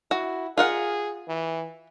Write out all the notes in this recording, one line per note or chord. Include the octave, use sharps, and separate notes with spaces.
E4 F#4
F4 G#4 A#4 F#5
E3